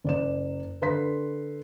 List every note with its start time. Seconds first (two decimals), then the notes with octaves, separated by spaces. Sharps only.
0.04 F#1 D5 E7
0.82 D3 B4 C6 B6